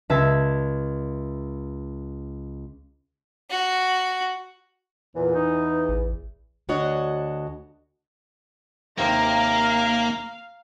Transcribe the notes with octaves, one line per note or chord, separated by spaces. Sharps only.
C#2 E5 A5 G#6
F#4
E2 A#2 E3
D#4
A1
D2 D4 F#4 C#5 D#5
D#2 C3 A#3 C5 F5 A#5